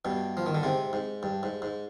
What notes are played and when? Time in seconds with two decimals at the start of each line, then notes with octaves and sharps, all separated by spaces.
0.05 G2 B2
0.37 F3
0.46 D#3
0.55 D3
0.63 G#2 C3
0.93 G#2
1.23 G2
1.43 G#2
1.62 G#2